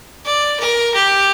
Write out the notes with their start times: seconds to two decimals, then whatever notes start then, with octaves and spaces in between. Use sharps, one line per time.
0.25 D5
0.60 A#4
0.95 G4